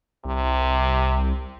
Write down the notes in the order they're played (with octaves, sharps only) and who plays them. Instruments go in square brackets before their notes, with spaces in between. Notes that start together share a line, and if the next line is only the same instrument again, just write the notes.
[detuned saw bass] C2 [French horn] C3